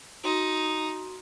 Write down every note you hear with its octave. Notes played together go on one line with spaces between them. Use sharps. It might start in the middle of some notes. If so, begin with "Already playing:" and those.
D#4 F#4 C6 D#7